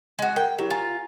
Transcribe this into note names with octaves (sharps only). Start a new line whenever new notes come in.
G#3 F#4
A#4 G5
F#3 E4 G4
F4 G#5 A#5